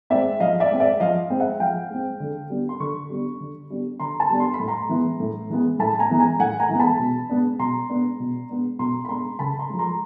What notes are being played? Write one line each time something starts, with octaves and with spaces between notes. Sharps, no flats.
G#3 C4 D5 E5
F3 D#5 F5
D5 E5
G#3 C4
D5 E5
F3 D#5 F5
G#3 C4
E5 F#5
F3 F5 G5
G#3 C4
D3
G3 B3 D4
C6
D3 B5 C#6
G3 B3 D4
D3
G3 B3 D4
D3 A#5 C6
A5 B5
G3 B3 D4
C6
B5
A2
A#5 C6
E3 G#3 B3
A2
E3 G#3 B3
A2 A5 B5
G#5 A#5
E3 G#3 B3
G#5 A#5
A2 F#5 G#5
G#5 A#5
E3 G#3 B3
A5 B5
B2
G#3 B3 D4
B2 A#5 C6
G#3 B3 D4
B2
G#3 B3 D4
B2 A#5 C6
B5
G#3 B3 D4 A#5 C6
C#3 A5 B5
A#5 C6
F3 G#3
A#5 C6